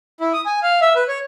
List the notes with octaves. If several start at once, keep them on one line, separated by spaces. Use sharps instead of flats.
E4
D#6
G#5
F5
E5
B4
C#5